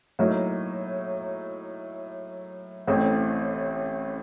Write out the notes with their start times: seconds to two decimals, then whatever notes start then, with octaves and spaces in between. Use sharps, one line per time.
0.19 A2 F#3 A#3 D#4
2.87 A1 A2 A3 C4